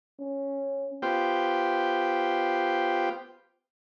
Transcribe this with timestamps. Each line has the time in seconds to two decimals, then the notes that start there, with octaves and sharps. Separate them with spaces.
0.20 C#4
1.02 B3 F4 G4 C5 G5